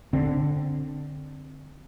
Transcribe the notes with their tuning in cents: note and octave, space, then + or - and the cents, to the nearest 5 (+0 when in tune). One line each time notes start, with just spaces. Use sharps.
D3 +0 C4 +0